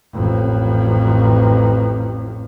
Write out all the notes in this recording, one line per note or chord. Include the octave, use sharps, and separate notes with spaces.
A1 F2